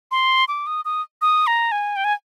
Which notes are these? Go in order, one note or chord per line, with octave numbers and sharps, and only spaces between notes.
C6
D6
D#6
D#6
D#6
A#5
G#5
G5
G#5